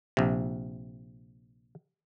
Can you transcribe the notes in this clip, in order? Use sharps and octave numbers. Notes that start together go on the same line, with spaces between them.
A#1 C3